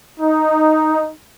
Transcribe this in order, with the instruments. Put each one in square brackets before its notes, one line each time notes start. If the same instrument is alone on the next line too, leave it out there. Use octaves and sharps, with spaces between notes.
[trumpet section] D#4